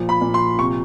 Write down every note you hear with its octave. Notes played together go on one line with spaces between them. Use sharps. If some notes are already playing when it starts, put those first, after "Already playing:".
Already playing: A#2 F3
B5
A#2
C6
C3 C#6